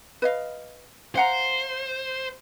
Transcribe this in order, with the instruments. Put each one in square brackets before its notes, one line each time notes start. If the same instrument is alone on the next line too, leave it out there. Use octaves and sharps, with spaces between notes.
[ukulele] B4 D#5 F5
[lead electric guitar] C5 [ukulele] F5 F#5 A#5